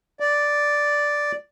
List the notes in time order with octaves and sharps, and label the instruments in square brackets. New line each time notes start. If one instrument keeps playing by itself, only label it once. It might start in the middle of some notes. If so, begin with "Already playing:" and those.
[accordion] D5